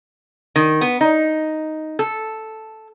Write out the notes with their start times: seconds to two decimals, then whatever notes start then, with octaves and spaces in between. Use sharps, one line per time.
0.56 D#3
0.81 B3
1.01 D#4
1.99 A4